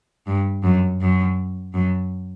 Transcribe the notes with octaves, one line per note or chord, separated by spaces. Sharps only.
G2
F#2
F#2
F#2